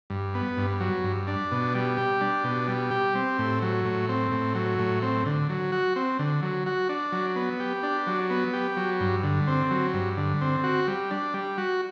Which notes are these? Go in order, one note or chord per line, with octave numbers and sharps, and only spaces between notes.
G2
B3
G2
F#3
G2
D4
B2
G3
G4
D4
B2
G3
G4
C4
A2
F#3
A2
C4
A2
F#3
A2
C4
D3
F#3
F#4
C4
D3
F#3
F#4
D4
F#3
B3
G4
D4
F#3
B3
G4
F#3
G2
D3
C4
F#3
G2
D3
C4
F#4
G3
D4
G3
F#4